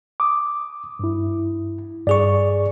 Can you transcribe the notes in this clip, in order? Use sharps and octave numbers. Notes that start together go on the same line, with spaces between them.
D6 D#6
G2 E4
G2 G#4 D5 C#6